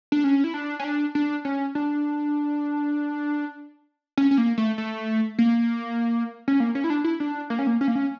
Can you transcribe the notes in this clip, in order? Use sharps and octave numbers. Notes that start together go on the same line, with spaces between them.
D4
C#4
E4
D4
C#4
D4
D4
C#4
D4
C#4
C#4
A#3
A3
A3
A#3
C#4
A#3
C#4
E4
D4
E4
D4
A#3
C#4
A#3
C#4
A#3
C#4